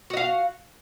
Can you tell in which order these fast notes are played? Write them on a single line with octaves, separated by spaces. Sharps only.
F#4 D#5 F5